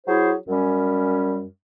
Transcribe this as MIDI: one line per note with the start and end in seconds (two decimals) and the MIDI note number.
0.07 0.33 54
0.07 0.33 64
0.07 0.33 68
0.07 0.33 72
0.47 1.45 42
0.47 1.45 55
0.47 1.45 61